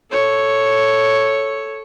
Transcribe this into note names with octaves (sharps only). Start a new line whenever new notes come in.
A4 C#5